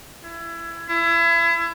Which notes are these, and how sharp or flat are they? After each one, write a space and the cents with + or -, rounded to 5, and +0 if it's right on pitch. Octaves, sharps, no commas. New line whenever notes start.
E4 +25
E4 +30